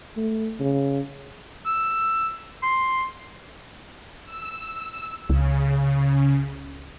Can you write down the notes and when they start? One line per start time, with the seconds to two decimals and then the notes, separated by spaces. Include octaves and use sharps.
0.17 A3
0.60 C#3
1.66 E6
2.63 C6
4.25 E6
5.30 C#2 C#3